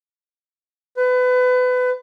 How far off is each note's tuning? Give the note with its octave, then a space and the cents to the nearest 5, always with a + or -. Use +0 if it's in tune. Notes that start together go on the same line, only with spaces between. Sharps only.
B4 +30